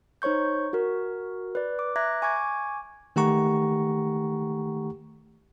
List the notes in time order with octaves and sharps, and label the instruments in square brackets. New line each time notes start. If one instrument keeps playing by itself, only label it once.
[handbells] D#4 C5 C#5 C#6 G6
F#4 A#4
B4 D5
D6
E5 A#5 D6 F#6 G#6 A#6
G#5 C#6 D6 G#6
[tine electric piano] D#3 A3 G4 F#5 A#5 C#6